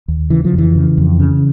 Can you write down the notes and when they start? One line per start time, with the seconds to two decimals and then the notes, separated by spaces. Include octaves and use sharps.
0.08 D#2
0.30 C#3 E3
0.45 F3
0.54 F2 E3
0.75 C#3
0.98 F2
1.20 C#3